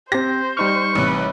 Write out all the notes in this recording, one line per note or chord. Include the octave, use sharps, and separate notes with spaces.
C4 G4 C5 A#6
G3 D#4 C#6 F6
A1 C3 B4